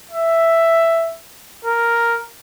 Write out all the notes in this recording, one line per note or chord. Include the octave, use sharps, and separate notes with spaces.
E5
A#4